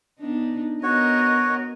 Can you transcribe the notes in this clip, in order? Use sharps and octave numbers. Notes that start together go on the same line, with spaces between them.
B3 D4 D#4
B3 F#4 A#4 C#5 D#5